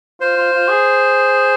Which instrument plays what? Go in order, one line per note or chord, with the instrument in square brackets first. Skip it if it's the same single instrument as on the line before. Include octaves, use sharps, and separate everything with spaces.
[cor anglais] F4 [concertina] C5
[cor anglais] F4
F4
G#4